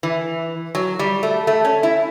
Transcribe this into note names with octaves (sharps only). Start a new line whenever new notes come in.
E3
F#3
G3
A3
A3
C#4
E4